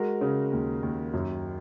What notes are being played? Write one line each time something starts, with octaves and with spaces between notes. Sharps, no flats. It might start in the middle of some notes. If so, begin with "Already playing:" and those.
Already playing: G#3 F#4 A#4
C#3
D#2
D#2
F#2